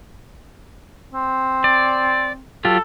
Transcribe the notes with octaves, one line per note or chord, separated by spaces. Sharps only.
C4
D5
F#3 F4 G4 A4